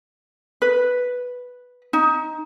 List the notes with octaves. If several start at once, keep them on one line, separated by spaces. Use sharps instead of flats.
B4
D#4